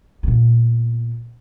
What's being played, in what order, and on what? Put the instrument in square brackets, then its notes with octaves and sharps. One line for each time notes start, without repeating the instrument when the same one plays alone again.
[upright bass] A#2 B3